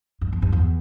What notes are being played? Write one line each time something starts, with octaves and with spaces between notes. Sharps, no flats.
G2
E2
G2
E2